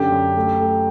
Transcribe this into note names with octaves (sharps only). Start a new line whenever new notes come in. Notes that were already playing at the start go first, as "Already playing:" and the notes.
Already playing: F#2 D3 G4
F#2
A3
A3